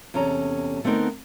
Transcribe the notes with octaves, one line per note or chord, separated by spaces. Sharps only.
E2 C3 C#4 A4 A#5
D3 A3 B3 C4 D#4 A#4